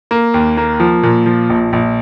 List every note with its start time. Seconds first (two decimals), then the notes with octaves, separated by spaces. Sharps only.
0.11 A#3
0.34 D#2
0.57 A#3
0.80 F3
1.03 A#2
1.26 F3
1.50 A#1
1.73 A#1